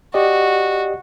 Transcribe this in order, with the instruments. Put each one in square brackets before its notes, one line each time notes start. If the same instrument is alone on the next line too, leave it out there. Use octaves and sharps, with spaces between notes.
[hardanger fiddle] F#4 [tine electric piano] G4 D5 D#5